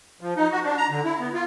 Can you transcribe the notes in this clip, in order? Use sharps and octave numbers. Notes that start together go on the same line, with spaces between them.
F3
D#4
F#4
D4
A#5
D3
E4
B3
F4